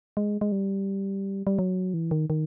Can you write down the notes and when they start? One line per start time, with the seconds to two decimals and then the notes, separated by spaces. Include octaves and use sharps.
0.17 G#3
0.41 G#3
0.52 G3
1.47 G3
1.59 F#3
1.94 E3
2.11 D#3
2.30 D#3